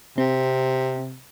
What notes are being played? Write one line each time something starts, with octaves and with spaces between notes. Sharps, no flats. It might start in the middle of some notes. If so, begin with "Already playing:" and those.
C3 C4